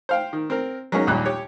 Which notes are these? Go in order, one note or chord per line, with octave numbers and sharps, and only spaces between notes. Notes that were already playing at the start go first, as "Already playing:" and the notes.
C5 F5 G5
D#3
C4 A#4
F#3 G#3 A#3 C#4 D#4
A#1 D#2 A#2 G3 F#6
G4 C#5